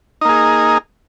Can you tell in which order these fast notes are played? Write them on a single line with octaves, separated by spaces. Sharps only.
D#4 A#3 G#4